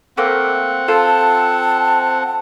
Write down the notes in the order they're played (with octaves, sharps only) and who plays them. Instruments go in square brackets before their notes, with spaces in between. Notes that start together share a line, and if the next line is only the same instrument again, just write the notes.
[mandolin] A3 A#3 [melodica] C4 F#5
[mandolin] F4 A4 G5 [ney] A5